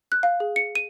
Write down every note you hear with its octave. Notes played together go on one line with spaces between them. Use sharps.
F#6
F5
G#4
C#7
D#7